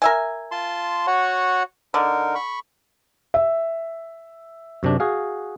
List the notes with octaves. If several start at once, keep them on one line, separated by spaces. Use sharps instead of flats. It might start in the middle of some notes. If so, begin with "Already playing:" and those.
A#4 E5 G#5
F4 A5 C6
F#4 C#5 F#5
D3 D#4 A#4
B5 C#6
E5
F#2 C3 D4
F#4 G#4 F5